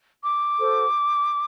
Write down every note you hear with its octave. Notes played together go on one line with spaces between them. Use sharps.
D6
F#4 A4 C5